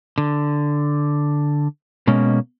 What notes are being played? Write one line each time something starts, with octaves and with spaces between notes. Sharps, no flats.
D3
B2 G#3 A#3 C#4